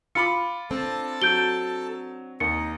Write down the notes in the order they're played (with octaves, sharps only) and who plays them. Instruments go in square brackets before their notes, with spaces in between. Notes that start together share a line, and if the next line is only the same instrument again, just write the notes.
[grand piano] F4 B5 D6 [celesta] C#7
[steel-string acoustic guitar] C4 D4 [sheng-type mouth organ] A4 A5
[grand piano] F#3 [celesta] G6 D7 G7
[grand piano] D#2 [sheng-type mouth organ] D#4 [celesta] C#7